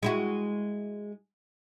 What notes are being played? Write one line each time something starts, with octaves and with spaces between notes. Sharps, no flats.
G#3 E4 F#4